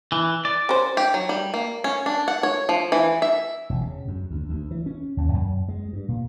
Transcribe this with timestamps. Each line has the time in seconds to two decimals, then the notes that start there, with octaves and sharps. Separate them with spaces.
0.12 E3
0.45 D5
0.69 C#4 C5
0.97 G4
1.14 F#3
1.29 G3
1.54 A#3
1.84 C#4
2.06 D4
2.28 F#5
2.43 C#5
2.69 F3
2.92 E3
3.22 E5
3.70 E1
3.81 C#3
4.08 F#2
4.30 D2
4.49 D2
4.71 E3
4.86 C#4
5.17 D#2
5.33 F#2
5.69 G#3
5.93 G2
6.08 A#2